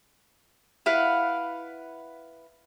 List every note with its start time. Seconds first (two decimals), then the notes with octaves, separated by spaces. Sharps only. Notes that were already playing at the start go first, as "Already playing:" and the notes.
0.86 E4 B4 F5 F#5